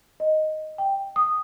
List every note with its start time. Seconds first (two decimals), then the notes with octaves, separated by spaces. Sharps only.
0.20 D#5
0.78 G5
1.16 D#6